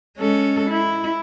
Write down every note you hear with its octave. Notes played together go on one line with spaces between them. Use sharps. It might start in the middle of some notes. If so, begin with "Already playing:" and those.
G#3 C#4 A4
E4